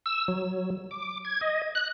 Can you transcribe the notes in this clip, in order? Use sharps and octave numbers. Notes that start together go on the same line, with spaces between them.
E6
F#3
D6
G#6
D#5
F#6